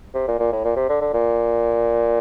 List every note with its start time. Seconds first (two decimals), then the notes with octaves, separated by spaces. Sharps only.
0.14 C3
0.28 A#2
0.39 A#2
0.52 A2
0.64 A#2
0.76 C3
0.89 D3
1.01 D3
1.14 A#2